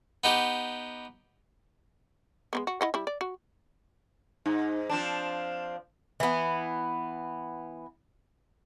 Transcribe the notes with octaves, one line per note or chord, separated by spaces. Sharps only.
B3 D#4 G4
G#3 A#3 B3
F#4
E4 D#5 F#5
G3 E4
D5
F#4
G#2 D#4 F#5
F3 C4 D4 E7
E3 B3